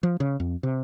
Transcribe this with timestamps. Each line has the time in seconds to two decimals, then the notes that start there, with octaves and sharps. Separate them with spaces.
0.03 F3
0.20 C#3
0.40 F2
0.63 C3